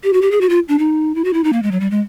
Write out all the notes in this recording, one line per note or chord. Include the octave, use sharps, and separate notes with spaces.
G4
F#4
G4
G#4
F#4
F4
D4
D#4
E4
F#4
E4
D#4
A#3
G#3
F#3
G3
G#3